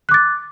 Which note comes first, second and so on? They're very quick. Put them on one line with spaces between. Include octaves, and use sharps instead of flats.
F#6 D6 A6